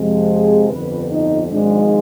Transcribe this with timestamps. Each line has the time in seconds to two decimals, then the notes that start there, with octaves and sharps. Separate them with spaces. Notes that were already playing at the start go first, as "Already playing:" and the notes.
Already playing: F2 C3 F3 G#3
0.29 G#4
0.69 G1 F2 D3 B4
1.10 D#4
1.51 G#1 G#2 F3 G#3 D4